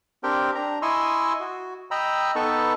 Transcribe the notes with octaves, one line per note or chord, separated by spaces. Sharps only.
C4 D4 G4 A#4 G5
D4 A#5
E4 D#5 G#5 C6 C#6 E6
F#4
D#5 G5 A#5 B5 E6
B3 D#4 A4 B4 A5 C#6